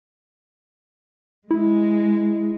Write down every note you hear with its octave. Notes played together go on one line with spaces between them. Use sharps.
G#3 E4